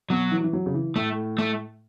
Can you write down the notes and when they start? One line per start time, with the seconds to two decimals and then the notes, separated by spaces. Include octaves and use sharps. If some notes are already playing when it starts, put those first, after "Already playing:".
0.10 B2 F#3
0.31 E3
0.44 E3
0.53 F#3
0.66 C#3
0.74 E3
0.96 A2 A3
1.38 A3